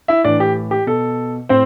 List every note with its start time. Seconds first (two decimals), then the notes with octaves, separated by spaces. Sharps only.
0.08 E4 E5
0.24 A2 E3 D4 D5
0.40 G4
0.71 G4
0.87 B2 A4
1.49 A2 C4 C5